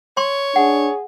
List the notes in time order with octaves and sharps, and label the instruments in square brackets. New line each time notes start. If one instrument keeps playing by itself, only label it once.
[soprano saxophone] C#5 [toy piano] C6
[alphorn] D4 [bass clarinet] G#4 [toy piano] F#5